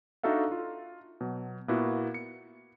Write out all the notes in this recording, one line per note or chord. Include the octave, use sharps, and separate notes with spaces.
D4 D#4 F#4 A4 E5 F5
F4
B2 F#3
A#2 A#3 B3 E4 F#4
C#7